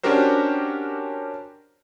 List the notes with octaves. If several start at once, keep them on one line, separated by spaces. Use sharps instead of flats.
C#4 D4 F#4 G4 A#4 C5